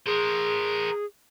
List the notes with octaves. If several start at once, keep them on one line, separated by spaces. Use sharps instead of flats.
G#4 A#4 C5